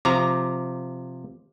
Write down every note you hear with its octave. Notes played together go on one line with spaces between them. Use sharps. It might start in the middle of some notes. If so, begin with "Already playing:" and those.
C3 F3 A#5 D6